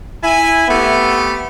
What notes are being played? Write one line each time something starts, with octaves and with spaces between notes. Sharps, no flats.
E4 G#5
A3 B3 C4 G4